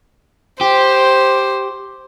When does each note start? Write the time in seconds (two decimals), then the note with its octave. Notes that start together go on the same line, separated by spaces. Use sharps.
0.61 G4 C5